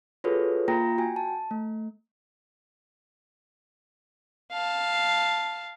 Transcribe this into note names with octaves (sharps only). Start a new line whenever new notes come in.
F4 F#4 G#4 A4 B4 C#5
A#3 F4 G5 A#5 A#6
F#4 G5 G#5
A5
A3
F5 A5